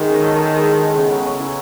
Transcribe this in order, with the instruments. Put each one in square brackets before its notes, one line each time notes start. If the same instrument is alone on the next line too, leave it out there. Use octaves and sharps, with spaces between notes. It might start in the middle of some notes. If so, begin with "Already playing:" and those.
Already playing: [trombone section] D#3 [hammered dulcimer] E3 G#3 B3
[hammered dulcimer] C#4
A4
A4
G#3
E4
G#3
[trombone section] C#3 [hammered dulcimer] B3
[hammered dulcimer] F#3
C#5
E4